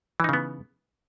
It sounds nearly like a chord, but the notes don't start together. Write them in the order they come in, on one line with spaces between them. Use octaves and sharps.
E3 D#4 C#3 B3